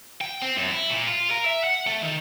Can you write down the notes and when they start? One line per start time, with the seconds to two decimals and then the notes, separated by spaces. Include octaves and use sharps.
0.21 G5
0.42 C4
0.57 F#2
0.70 E4
0.90 A#2
1.07 F4
1.30 A#4
1.45 E5
1.63 F#5
1.86 A3
2.01 D#3